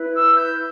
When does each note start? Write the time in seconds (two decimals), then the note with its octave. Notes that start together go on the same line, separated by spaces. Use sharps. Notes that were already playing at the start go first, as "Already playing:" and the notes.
Already playing: E4 B4
0.15 E6
0.37 G6